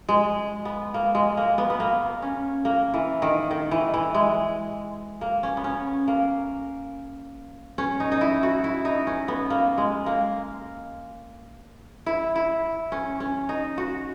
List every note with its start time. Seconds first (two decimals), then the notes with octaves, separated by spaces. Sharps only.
0.09 G#3
0.65 B3
0.94 A#3
1.15 G#3
1.37 A#3
1.58 B3
1.70 B3
1.80 A#3
2.22 C#4
2.65 A#3
2.94 E3
3.22 D#3
3.51 D#3
3.71 E3
3.94 E3
4.14 G#3
5.21 A#3
5.43 C#4
5.57 B3
5.64 C#4
6.08 A#3
7.78 C#4
8.00 D#4
8.12 D#4
8.21 E4
8.43 F#4
8.64 E4
8.85 D#4
9.07 C#4
9.28 B3
9.50 A#3
9.78 G#3
10.06 A#3
12.06 E4
12.36 E4
12.92 C#4
13.20 C#4
13.49 D#4
13.78 F#4